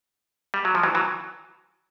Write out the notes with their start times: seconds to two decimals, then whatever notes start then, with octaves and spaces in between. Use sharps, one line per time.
0.54 G3
0.65 F#3
0.75 F3
0.83 E3 F#3
0.95 E3 F#3